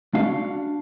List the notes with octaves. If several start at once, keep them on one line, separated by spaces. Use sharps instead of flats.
D4 F#4 F5